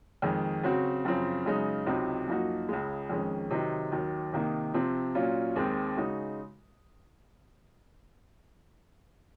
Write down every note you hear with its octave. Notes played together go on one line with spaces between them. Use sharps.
F2 D#3 G#3
C#3 F#3 C4 F#4
F#2 C#3 F3 C4
F#2 C#3 G#3 D#4
C#2 C3 F#3 C4 D#4
F#2 F3 A#3 D#4 F#4
C#2 C#3 G#3
F2 D#3 G#3 C#4
C3 D#3 F#3 C4 D#4
D#2 D#3 F#3
C3 D#3 A#3 D#4
C3 F3 C4
A#2 F#3 C#4 F4
D#2 D#3 G#3 C4
C#3 G#3 D#4 F#4